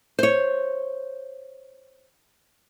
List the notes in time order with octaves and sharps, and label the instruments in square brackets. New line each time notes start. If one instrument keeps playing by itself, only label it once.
[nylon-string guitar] C5 C#5